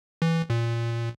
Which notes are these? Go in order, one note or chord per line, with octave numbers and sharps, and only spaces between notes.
E3
A#2